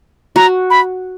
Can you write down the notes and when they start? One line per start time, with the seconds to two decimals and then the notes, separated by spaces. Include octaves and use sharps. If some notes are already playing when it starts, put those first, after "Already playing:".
0.36 F#4 A#5
0.70 B5